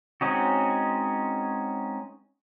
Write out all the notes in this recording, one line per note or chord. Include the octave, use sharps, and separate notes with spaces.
G#3 C4 C#4 D#4 F#4